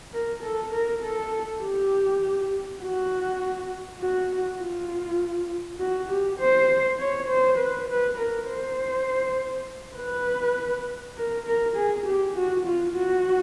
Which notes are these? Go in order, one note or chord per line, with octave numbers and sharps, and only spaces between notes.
A#4
A4
A#4
A4
G4
F#4
F#4
F4
F#4
G4
C5
C#5
C5
B4
B4
A#4
C5
B4
A#4
A#4
G#4
G4
F#4
F4
F#4